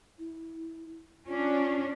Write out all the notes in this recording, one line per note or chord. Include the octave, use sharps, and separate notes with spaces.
E4
C#4 D4 F4